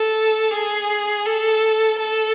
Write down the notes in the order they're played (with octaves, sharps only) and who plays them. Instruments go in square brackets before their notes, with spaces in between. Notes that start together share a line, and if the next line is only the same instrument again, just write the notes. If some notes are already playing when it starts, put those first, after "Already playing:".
Already playing: [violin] A4
G#4
A4
A4